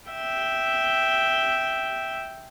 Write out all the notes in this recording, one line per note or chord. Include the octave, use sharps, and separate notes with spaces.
E5 G5